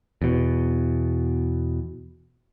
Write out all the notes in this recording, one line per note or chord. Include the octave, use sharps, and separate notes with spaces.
E2 B2